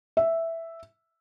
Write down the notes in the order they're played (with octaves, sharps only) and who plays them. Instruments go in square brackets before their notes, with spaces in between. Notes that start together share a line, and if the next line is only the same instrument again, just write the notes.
[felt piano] E5